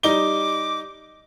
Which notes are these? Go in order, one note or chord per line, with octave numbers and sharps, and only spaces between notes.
G3 D#4 D6 G7